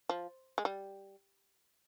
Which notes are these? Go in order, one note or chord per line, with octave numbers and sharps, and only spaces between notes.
F3
G#3
G3